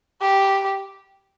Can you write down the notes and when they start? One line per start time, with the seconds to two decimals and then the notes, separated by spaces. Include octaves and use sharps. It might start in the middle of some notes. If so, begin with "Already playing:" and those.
0.22 G4